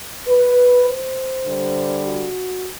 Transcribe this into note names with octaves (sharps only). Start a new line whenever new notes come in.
B4
C5
D3 G3
F#4